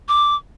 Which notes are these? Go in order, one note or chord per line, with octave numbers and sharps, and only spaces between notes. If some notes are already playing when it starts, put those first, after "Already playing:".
D6